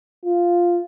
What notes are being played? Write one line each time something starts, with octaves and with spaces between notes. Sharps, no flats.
F4